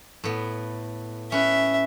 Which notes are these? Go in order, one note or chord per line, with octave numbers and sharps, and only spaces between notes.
A2 B3
C#4 B4 E5